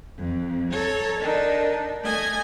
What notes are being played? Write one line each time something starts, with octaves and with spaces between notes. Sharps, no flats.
F2
A4 C#5 A#5
D#3 D4 D#4
A3 D#5 G#5 G#6